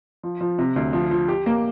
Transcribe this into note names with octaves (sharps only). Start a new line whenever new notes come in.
F3
F3
C3
D2
F3
F3
G4
A#3